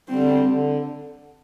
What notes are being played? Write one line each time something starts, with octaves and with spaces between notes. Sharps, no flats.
D3 G3 C4
D3